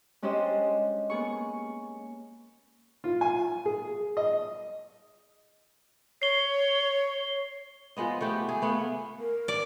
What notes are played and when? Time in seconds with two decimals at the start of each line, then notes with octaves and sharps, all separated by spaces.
0.22 G#3 C#4 D4 G4 C5 D#5
1.10 A#3 B3 G#4 C#6
3.04 F4
3.21 G#5
3.65 G#4
4.17 D#5
6.22 C#5 C7 G7
7.97 F3 G#3 B3 D#5
8.21 A3 B3 G4
8.49 G#4
8.62 A3 B3 F5
9.20 A#4
9.48 D5